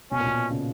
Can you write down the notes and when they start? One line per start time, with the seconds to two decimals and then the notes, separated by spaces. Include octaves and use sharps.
0.11 B2 C#4
0.20 A#2
0.27 B2
0.51 C#3